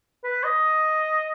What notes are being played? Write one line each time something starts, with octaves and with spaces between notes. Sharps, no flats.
B4
D#5